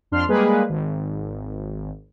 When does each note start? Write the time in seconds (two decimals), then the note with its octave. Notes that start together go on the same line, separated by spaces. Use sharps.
0.12 F2 D4 C6 F6
0.28 G3 G#3 A#3 G#4 B4
0.69 G#1